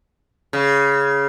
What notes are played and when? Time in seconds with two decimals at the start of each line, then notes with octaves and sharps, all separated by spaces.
0.53 C#3